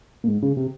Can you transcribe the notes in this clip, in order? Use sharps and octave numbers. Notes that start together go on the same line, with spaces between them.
A#2
G#2
C#3
C3